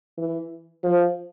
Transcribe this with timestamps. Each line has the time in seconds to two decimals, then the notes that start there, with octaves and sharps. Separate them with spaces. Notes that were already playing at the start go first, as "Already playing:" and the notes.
0.18 E3
0.83 F3